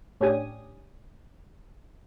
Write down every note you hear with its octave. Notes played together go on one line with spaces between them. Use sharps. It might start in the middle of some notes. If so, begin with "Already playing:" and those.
A2 C#4 D4 G4 G#5 D#6